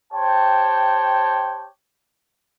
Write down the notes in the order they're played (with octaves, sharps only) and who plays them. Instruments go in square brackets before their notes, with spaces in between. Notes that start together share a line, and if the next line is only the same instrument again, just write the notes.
[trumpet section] G4 C5 C#5 G5 A5